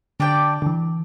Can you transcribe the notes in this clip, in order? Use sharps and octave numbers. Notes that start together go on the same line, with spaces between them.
D3 D4 G4 D5 G5
D3
E3